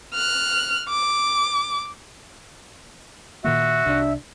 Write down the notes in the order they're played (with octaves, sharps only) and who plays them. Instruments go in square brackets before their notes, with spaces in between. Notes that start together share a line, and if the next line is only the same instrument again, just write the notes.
[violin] F6 F#6
D6
[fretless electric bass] A#2 D#3 A#3 [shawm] F#4 [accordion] E5
[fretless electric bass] C2 C3 [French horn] D4